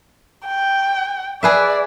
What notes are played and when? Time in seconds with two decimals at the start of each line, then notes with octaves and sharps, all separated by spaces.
0.47 G5
1.43 G#4 B4 D5 E5